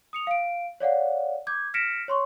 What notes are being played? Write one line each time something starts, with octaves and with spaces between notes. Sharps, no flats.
D#6 C#7 F7
F5 D7
C#5 D5 F5 F#5
D6 G6 G#6
F6 A#6 B6 C#7 D7 E7
C#5 C6 C#6